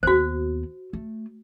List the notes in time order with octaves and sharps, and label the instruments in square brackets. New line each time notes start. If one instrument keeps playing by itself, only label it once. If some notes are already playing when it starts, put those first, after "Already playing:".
[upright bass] D#2 B3 [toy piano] F#4 C5
[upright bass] A3